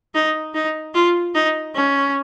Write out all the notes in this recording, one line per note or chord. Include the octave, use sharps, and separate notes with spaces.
D#4
D#4
F4
D#4
C#4